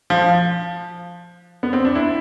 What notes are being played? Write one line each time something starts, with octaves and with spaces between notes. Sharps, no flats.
F3
B3
C4
D4
E4